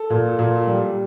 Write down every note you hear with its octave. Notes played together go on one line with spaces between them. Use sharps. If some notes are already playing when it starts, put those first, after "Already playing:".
Already playing: A4
A#2
A#2
G3